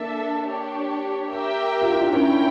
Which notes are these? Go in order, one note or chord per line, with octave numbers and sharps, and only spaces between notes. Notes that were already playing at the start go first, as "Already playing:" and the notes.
Already playing: A#3 D4 A4 E5 A5
D4 G4 C#5
G4 A#4 E5 G5
F4
E4
D4
C#4 E4 A#4 C#5 G5